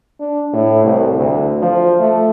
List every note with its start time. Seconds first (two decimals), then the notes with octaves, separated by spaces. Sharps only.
0.20 D4
0.53 A2
0.85 C2
1.18 D2
1.62 F3
1.99 A3